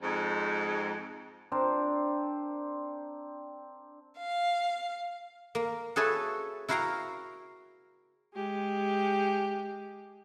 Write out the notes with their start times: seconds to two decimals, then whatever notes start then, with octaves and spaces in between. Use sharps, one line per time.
0.02 F2 G#2
1.52 C4 D4 A#4 C5
4.18 F5
5.55 A#3
5.96 F#4 G#4 A4 B4 C#5 E5
6.69 E4 F#4 A#4 F5 G5 A#5
8.34 G#3 G4